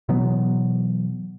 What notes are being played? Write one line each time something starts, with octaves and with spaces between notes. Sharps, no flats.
B2 E3 F#3 B3